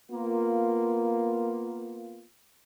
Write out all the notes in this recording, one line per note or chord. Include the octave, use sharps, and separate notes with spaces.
A#3 B3 F4